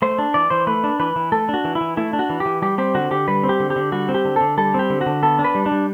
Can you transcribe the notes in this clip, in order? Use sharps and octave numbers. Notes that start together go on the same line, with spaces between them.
A3 C5
D4
E3 D5
E3 C5
A3 B4
D4
E3 B4
E3
A3 A4
D4 F#4
E3
E4
E3
A3 E4
D4
F#4
E3
G4
E3
G3 G4
C4 G4
D3 F#4
D3 G4
G3 B4
C4
G4
D3
G4
D3
G3 F#4
C4
G4
D3
D3 A4
G3 A4
C4 G4
D3
F#4
D3
B3 A4
D4
B4
G3
D4
G3